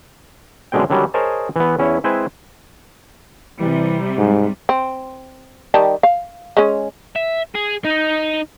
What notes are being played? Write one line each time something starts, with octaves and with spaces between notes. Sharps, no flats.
F#2 B2 D3 G#3 C4 G5
D3 D#3 F#3 G3 C#4
G#4 A#4 C5 C#5 D#5 A5
E3 B3
E2 C#4 E4 C#5
G#3 C4 E4 B4 C5 G#5
C3 E3 G3
G#2
C4
D#3 G3 A5
F5
G#3 C#4
E5
G#4
D#4